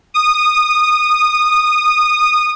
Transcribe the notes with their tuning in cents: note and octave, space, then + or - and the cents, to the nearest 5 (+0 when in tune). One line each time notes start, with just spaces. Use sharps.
D#6 -15